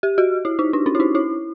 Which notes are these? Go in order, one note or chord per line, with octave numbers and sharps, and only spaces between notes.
G4
F#4
E4
D#4
D4
C#4
E4
D#4
E4